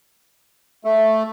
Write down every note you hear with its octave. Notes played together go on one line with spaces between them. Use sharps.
A3